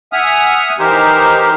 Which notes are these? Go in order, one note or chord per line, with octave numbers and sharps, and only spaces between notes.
E5 F#5 G#5 D#6 F6
E3 D#4 G4 A#4 C5